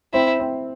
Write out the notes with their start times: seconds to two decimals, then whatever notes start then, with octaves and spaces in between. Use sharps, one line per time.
0.13 C4 E4
0.40 C4